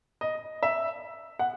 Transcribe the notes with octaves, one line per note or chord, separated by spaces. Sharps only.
D#5
E5
F#5